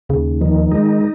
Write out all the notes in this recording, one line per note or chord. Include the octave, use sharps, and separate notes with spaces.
D#2 C#3
D#3 F3
G#3 D#4